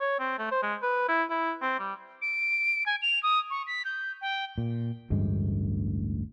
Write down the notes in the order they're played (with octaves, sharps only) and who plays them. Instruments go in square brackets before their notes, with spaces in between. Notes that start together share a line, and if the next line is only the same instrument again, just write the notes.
[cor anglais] C#5
C4
A3
C5
G#3
B4
E4
E4
C4
G3
[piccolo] D7
G#5
F7
D#6
C#6
B6
G6
G5
[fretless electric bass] A#2
A1 D2 G2 G#3